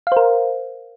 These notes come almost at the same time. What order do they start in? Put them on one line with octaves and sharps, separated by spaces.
F5 C5 A#4